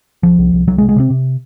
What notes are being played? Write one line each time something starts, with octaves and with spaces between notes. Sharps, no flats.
C2 F3
C2
C2
C2 F#3
G#3
C3
G#3
C3 C4
C3